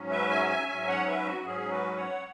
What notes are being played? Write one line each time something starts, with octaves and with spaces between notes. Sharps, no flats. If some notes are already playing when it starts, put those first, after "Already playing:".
Already playing: G#2 F#3 C#4
B4 E5
E5 G#5
E5 G#5
G#2 F#3 C#4 E5 G#5
C#5 F#5
B4 E5
F#4
G#2 F#3 C#4 G#4
F#4 B4
C#5 F#5